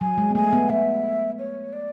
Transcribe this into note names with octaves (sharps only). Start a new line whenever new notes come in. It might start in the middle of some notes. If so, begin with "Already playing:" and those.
F#3 G#5
G#3
B3
A3 G#5
B3
B3 E5
C#5
D5